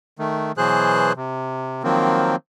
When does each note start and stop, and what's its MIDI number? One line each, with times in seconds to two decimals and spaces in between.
0.19 0.52 51
0.19 0.52 57
0.58 1.13 47
0.58 1.13 52
0.58 1.13 54
0.58 1.13 68
0.58 1.13 72
0.58 1.13 90
1.16 1.83 48
1.83 2.36 51
1.83 2.36 53
1.83 2.36 54
1.83 2.36 58
1.83 2.36 60